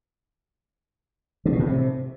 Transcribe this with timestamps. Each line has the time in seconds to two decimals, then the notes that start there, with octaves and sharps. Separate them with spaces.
1.45 D3
1.52 B2
1.59 A2
1.66 C3